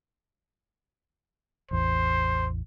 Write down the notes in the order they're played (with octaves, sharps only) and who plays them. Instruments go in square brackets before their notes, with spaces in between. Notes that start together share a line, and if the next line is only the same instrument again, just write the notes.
[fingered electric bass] A1 E2 [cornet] C5